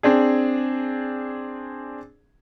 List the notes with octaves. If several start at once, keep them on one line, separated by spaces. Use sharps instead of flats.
C4 D4 G#4